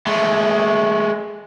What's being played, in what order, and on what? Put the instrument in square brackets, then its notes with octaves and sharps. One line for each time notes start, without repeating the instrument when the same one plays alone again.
[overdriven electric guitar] G#3 A3